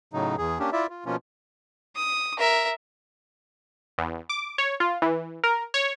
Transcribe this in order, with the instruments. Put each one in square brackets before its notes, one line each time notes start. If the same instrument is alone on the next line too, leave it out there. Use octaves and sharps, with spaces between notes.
[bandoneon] A2 C#3 F#3 D#4
E2 G#4
A#3 C#4 D4 G4
E4 F4 D5 E5
F4
B2 F3 A#3 C#4 F4
[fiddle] D#6
A#4 E5
[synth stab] E2
D6
C#5
F4
E3
A#4
C#5